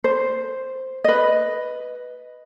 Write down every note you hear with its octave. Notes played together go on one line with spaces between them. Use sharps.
C5
B4 D#5